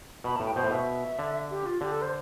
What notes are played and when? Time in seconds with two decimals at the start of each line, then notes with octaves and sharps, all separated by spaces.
0.24 B2 B5
0.36 A2 A5
0.45 G5
0.55 B2 C5
0.63 A2
0.70 B2 E5
1.19 D3
1.50 G4
1.66 F4
1.81 D3 G4
1.92 A4
2.02 C5